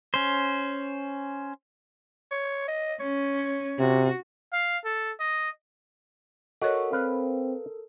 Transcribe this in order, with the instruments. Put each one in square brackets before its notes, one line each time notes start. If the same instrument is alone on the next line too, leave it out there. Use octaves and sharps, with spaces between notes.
[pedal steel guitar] C#4 C5
[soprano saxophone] C#5
D#5
[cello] C#4 [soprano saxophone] C#5
[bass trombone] C3 [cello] F#4
[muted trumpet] F5
A4
D#5
[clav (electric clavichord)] F#4 [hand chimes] A4 A#4 [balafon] C#5 D#5
[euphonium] C4 [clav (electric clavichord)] B4 F5